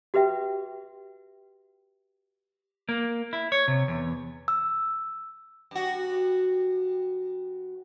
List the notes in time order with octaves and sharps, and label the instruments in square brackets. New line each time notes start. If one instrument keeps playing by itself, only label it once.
[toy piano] F#4 G4 B4 E5 G5
[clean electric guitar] A#3
E4
C#5
C3
E2
[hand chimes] E6
[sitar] G2 F#4